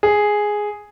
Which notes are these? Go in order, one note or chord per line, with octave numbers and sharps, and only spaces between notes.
G#4